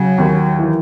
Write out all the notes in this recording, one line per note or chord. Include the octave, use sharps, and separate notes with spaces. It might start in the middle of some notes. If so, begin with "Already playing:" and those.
Already playing: C#3 F#3
D#2
E3